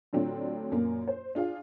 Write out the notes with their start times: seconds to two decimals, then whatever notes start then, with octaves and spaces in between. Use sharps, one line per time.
0.13 A2 D3 F#3 C4 D4 F4
0.72 F#2 A#2 A#3
1.08 C5
1.35 D4 F4 G#4 F5